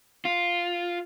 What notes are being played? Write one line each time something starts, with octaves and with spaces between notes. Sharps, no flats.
F4